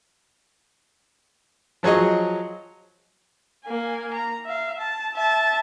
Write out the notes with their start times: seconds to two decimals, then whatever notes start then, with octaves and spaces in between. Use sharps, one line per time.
1.83 F3 F#3 G#4 C#5 D#5
3.65 A#3 G#5
4.13 A#5
4.45 E5 F5
4.79 A5
5.14 E5 A5